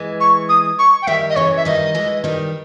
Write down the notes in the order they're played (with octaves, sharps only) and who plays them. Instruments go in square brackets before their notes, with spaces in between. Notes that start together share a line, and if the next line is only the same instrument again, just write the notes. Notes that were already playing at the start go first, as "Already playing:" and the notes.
Already playing: [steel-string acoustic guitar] E3 G#3
[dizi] C#6
D#6
C#6
G5
[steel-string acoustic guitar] D#3 G3 [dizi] E5
[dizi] D#5
[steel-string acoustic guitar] C#3 E3 [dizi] C#5
[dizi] E5
[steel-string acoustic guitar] D#3 G3 [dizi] D#5
[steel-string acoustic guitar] E3 G#3
D#3 G3